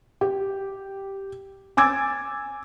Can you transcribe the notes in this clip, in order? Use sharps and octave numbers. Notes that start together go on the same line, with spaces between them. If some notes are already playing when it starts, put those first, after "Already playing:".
G4
G#5 D6 E6 G#6 A6